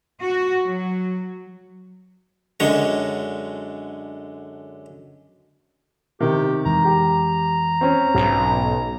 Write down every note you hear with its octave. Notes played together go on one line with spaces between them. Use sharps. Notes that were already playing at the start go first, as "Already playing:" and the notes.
F#4
F#3
F#2 D3 G#3 C#5
C3 D#3 G4
F2 E3 G#3 A#5
G4
C4 C#4
B1 G#2